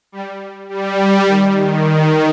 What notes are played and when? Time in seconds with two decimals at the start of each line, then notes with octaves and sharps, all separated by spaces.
0.12 G3
0.69 G3
1.26 D#3
1.55 D#3